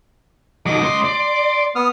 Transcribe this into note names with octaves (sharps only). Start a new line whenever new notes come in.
D#3 F#3 D#5 D6
C#2 C6
D5 C6
B3 D#6 F6